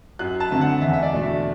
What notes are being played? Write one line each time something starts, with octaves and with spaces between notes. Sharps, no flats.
F#2 F#6
A5
D3 A3 C4
F#5
E2 E5
E5
D5
B2 A3 D4
E5